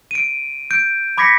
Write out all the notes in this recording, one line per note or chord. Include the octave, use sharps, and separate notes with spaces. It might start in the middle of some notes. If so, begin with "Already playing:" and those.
D7 D#7
G6 D7
B5 D6 G#6 A#6 B6 C#7